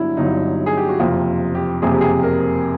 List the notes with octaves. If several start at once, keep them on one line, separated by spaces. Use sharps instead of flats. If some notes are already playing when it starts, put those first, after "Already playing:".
Already playing: G1 G2 D3 F#3 E4
G1 G2 D3 F#3 D#4
G#4
G4
F#4
F#1 F2 C3 F4
G4
F#1 F2 C3 G#4
G4
G#4
A#4